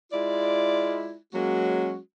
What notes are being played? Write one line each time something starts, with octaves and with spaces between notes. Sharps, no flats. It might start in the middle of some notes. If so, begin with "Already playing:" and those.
G#3 E4 F4 D5
F#3 G#3 A#3 C#4 F#4